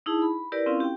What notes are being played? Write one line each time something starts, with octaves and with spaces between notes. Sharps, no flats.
D#4 E4 G#4 A5
B5
E4 G4 A#4 B4 D5
C4 C#4 E4 F4 F5
G4 G5